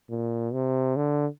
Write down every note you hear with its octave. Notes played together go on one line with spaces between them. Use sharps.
A#2
C3
D3